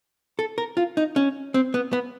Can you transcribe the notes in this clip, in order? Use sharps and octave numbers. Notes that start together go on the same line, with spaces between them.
A4
A#4
F4
D#4
C#4
C4
B3
B3